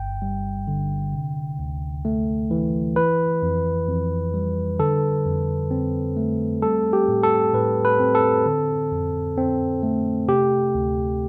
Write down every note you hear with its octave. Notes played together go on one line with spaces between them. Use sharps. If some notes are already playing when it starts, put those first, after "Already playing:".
Already playing: G1 G2 G5
G3
D3
C3
D2
A3
E3
E3 B4
F2
F2
G3
D3 A4
F2
C4
A3
G3 A4
G4
A2
A4
A2 B4
B4
C4
A4
D3
F2
C4
A3
C3 G4
D2